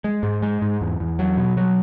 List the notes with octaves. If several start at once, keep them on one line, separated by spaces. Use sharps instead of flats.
G#3
G#2
G#3
G#2
E2
E2
F#3
B2
F#3